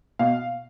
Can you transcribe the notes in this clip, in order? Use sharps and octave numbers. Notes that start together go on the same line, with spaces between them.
B2 F5